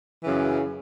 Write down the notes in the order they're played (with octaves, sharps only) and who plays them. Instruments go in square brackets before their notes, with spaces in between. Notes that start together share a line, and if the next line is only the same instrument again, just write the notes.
[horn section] F#2 C#3 E3